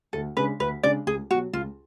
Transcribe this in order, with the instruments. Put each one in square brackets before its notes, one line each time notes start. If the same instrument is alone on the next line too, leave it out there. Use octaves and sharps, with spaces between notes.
[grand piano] D2 [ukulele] A4
[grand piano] C#3 G#3 D4 [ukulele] B4
[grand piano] D2 [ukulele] B4
[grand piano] C#3 G#3 D4 [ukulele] D5
[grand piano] C#2 [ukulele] G#4
[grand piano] B2 [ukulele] F#4
[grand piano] F#3
[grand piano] C#2 [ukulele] F4